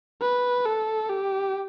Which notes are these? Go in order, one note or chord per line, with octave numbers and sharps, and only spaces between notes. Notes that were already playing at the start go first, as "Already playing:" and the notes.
B4
A4
G4